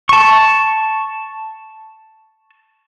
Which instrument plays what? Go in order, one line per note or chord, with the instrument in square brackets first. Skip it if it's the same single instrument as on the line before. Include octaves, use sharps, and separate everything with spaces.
[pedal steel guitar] A5 C#6